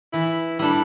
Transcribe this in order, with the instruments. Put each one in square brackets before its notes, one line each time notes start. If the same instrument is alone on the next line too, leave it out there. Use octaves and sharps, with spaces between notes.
[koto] E3 [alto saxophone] E4
[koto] G3 D4 A4 [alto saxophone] E4